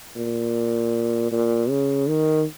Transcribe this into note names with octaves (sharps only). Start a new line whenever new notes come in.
A#2
A#2
C#3
D#3